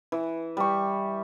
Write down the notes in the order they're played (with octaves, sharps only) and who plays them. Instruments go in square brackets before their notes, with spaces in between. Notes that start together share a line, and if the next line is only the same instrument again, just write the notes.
[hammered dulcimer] E3
G3 C#6